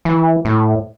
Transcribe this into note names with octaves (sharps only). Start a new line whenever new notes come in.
E3
A2